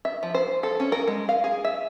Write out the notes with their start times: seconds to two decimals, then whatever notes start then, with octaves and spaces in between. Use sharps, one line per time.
0.05 E5
0.23 F3
0.34 C5
0.63 A4
0.80 C#4
0.92 A#4
1.07 G#3
1.29 F5
1.44 G#4
1.64 E5